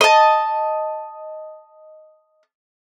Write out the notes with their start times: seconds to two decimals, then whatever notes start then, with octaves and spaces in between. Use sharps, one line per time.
0.01 D#5 A5